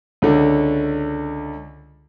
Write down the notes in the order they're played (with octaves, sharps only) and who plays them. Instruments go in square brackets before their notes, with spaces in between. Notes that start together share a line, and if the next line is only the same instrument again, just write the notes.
[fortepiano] C#2 D3